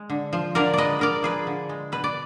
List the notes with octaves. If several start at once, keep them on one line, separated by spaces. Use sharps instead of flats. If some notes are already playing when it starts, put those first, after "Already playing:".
Already playing: G#3
D3
F3
D3 A#4 D5
G#3 B4 D5 D#5
D3 A#4 D5
F3 G#4 B4
D3
G#3
B2 B4
D5